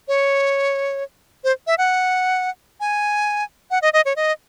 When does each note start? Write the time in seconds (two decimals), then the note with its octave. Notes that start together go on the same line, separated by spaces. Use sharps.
0.08 C#5
1.44 C5
1.67 E5
1.78 F#5
2.80 G#5
3.71 F#5
3.82 D#5
3.93 D#5
4.05 C#5
4.16 D#5